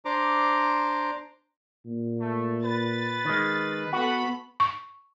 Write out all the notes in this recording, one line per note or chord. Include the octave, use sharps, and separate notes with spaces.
D4 C5 A#5 D6
A#2
A3
B4 A6
D#3 G#3
B3 F#4 A4 B4 F#5 B5
C#6